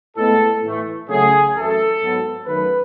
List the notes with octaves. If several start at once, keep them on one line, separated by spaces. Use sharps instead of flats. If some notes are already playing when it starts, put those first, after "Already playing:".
A2 G#3 B3 A4
A2 E3 A3
C#3 F#3 A3 G#4
F#2 E3 A3 A4
G#2 F#3 B3
F#2 D#3 F#3 A3 B4